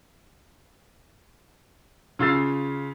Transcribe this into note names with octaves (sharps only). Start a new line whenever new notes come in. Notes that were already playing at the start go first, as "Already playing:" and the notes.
C#3 F4 E6 A6 C7